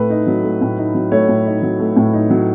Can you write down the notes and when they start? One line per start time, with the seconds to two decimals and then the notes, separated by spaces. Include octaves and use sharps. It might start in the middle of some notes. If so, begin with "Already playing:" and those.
Already playing: A2 A3 B4
0.10 D#4
0.27 F#3
0.44 A3
0.61 A2
0.77 D#4
0.95 F#3
1.12 A3 C#5
1.28 A2
1.46 D#4
1.62 F#3
1.79 A3
1.96 A2
2.13 D#4
2.30 F#3